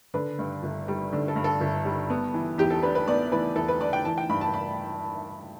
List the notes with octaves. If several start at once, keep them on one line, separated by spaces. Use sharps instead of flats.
D3 B4
G2
G1
G3
D3
A4
G2
A4
G1
G3
B3
E3
E2 G4
A4
D4 B4
B4
B3 D5
E3 B4
E2 A4
B4
D4 D5
G5
E3 A5
G5
G2 B5
A5
B5